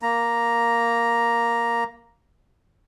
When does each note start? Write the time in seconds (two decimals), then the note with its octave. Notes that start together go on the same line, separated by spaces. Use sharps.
0.02 A#3 A#5